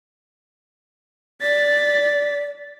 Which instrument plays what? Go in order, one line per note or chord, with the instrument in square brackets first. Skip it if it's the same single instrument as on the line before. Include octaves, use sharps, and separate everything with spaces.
[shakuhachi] D5 [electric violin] A6 B6